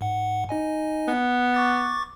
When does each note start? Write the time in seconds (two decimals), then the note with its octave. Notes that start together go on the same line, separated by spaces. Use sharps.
0.01 G#2 F#5
0.49 D#4 D#5 G#5
1.08 B3
1.54 C#6 D6 A6